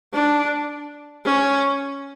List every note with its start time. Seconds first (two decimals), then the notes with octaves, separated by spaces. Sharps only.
0.13 D4
1.25 C#4